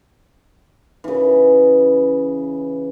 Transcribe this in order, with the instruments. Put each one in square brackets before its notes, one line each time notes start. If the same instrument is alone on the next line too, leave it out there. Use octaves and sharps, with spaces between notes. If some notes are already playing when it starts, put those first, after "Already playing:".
[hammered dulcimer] C#3 E3